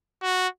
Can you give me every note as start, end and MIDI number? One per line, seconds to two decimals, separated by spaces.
0.22 0.48 66